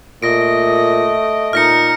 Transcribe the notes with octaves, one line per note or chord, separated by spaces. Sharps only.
A#2 A3 D#5 A#6 D7
A#2 D#4 A#5 F6 A#6 C#7